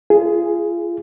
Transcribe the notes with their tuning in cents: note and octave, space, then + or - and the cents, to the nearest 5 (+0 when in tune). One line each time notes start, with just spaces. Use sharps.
F4 -35 G#4 +0